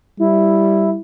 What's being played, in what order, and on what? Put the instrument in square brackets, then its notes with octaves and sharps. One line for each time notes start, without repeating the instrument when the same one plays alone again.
[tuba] G3 [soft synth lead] E4